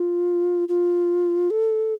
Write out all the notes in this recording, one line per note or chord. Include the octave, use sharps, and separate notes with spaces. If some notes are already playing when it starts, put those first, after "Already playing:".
Already playing: F4
F4
A4